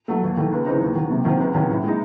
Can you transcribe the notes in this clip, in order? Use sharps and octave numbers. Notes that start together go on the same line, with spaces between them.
F#3 A3
D#2
D#3 A3
C#2
C#3 E3 C4 D#4
D#2
D#3 F#3
C3
D#3 F#3 C4
C#2
C3 D#3 F#3 C#4
A2
G#3 D#4